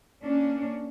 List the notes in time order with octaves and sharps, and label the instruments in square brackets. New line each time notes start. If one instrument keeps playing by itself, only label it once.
[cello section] A#3 C#4 D4